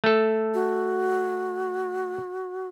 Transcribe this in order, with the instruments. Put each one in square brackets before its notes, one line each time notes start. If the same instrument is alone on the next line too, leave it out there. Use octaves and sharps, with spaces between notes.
[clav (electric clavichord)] A3 A4
[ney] F#4